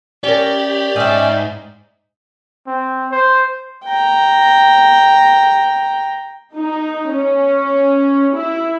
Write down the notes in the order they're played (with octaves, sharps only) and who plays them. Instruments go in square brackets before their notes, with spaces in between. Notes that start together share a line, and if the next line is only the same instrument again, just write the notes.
[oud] C#4 A#4 [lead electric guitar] G4 [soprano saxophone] D5
[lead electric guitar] G#2 [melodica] C#4 G5 [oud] D#4 E5
[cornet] C4
C5
[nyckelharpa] G5 A#5
[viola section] D#4
C#4
E4